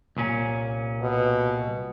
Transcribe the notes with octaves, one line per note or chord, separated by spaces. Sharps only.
C2 A#2 C#4
B2